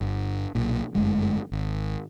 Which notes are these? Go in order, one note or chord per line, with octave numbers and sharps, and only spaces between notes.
G1
B1 A#2
G1 F#2 G#3 A3
G#1